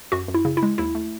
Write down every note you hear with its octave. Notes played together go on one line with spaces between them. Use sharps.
F#2 F#4
F#2
E4
C#3
E4
G#3
D#2 E4
A3